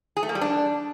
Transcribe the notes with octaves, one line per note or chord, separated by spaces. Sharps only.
G#4
A3
A#3
G3
D4